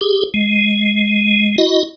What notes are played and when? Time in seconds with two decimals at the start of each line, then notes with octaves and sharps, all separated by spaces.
0.01 G4 G#4
0.34 G#3
1.58 E4 F#4 D#5